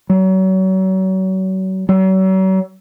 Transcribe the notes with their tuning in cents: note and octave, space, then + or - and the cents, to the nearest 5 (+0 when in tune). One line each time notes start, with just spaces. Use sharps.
F#3 +35
F#3 +40